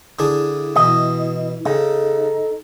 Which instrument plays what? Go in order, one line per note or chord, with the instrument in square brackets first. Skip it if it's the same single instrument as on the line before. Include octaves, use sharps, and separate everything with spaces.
[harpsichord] D3 D4 G#4 [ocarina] E4
[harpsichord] B2 E3 [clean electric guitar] D#5
[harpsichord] C#3 [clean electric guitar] D#4 [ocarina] A4